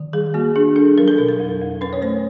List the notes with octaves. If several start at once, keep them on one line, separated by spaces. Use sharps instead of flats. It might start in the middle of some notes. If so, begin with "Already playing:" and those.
Already playing: D#3
G3 G#4
A#3 F#4
D4 G#4
D4 A4
F#3 A#4
A4
B2 A#4
A#4
F2
F2
C#4 B4
C#5
A3 C5